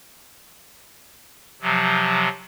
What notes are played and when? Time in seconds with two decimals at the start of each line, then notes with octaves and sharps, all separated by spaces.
1.62 C3 F3 F#3